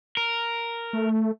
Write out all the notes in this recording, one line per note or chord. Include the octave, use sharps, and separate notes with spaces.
A#4
A3